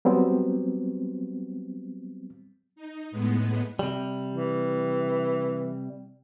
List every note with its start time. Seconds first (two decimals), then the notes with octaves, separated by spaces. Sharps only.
0.05 F#3 G3 B3 C4
2.76 D#4
3.11 A2 G#3 B3
3.79 C3 G3
4.33 E3